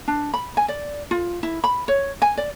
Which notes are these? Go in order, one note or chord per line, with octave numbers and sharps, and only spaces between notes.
D4
B5
G#5
D5
F4
E4
B5
C#5
G#5
D5